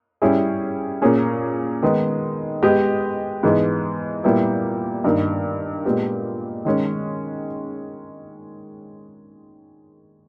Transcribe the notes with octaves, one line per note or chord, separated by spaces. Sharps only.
G3 C#4 E4 G#4
A#2 A#3 C#4 G#4
D#3 G#3 B3 D#4
G#3 B3 G4 B4 D#5
G#2 E3 G#3 B3
A#2 G3 B3 E4
G2 D#3 A#3 D#4 A#4
A#2 G#3 B3 G4
D#3 G#3 C#4